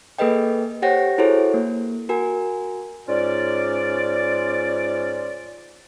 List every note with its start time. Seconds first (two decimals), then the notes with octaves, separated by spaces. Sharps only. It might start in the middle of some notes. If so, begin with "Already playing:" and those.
0.18 A#3 G#4 A4 B4 D#5 G5
0.82 G4 C5 C#5 F#5 G5 A#6
1.18 E4 F#4 G#4 A4 C5 C#5
1.54 A#3
2.09 F#4 A#4 G#5
3.08 G#2 C#4 F4 D5